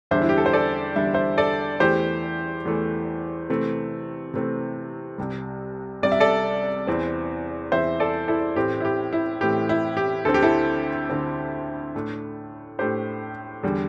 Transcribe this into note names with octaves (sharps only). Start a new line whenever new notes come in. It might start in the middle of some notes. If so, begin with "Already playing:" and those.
E2 D3 G3 D4 C5 E5
E4
G4
A4
C5
A4 D5
E2 D3 G3 D4 E5
C5 E5
A4 D5
E2 E3 A3 G4 C5
E2 E3 A3
C3 E3 A3 C4
C3 E3 A3 C4
C2 C3 G3
C2 C3 G3 D5
E5
A4 D5
E2 E3 C4
E2 E3 C4 C5 E5
A4 D5
E4 A4
A2 E3 A3 C4 G4
E4
G4
E4
A2 E3 A3 C4 G4
E4
G4
D2 D3 C4 A4
G4
E4 A4
D2 D3 C4
A2 A3 D4
A2 A3 D4 G4 C5
E2 D3 G3